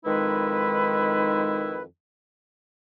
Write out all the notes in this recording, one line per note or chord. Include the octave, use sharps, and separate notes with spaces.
F2 D#3 G#3 D#4 E4 B4